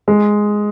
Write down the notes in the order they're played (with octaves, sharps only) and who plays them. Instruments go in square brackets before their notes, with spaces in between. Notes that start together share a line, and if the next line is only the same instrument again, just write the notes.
[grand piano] G#3